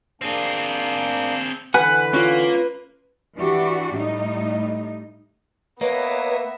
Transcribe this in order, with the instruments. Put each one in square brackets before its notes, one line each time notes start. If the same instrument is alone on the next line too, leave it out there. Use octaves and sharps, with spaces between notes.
[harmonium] A#3 D4 [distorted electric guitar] C4 G#4
[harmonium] D3 E3 [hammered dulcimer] B4 [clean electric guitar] F#5 G#5
[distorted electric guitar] A#3 [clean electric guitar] C#4 F4
[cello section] E3 D4 F#4 G4
A2 G3 D#4
[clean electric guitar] A#3 [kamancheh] B3 E5 [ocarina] B4 [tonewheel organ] C#5 D#5 A#5